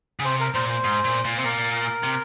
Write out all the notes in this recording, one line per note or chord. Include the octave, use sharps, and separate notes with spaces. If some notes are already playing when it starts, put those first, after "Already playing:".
C#3
C3 C5
A#4
A#2 C5
C5
G#2
A#2
A#2
C3 C5
A#2 A#4
C3